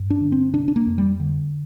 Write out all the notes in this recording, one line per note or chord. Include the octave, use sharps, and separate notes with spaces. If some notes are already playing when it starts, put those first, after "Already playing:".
Already playing: G2
D4
D3
C4
C3 D4
D4
A#3
F2
G3
D3